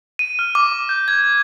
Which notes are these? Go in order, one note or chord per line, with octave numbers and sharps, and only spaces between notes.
D#7
F6
D6
G6
G#6